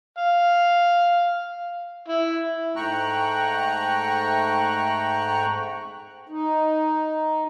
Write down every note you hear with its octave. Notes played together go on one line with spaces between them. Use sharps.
F5
E4
G#2 A3 G5 A#5 C#6 F#6
D#4